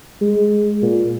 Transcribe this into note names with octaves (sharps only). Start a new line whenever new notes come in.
G#3
A#2